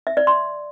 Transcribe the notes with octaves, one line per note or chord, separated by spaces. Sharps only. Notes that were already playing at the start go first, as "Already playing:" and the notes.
E5
D5
C6